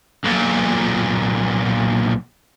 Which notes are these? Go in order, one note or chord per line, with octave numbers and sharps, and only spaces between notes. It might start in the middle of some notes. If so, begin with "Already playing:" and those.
B1 A#2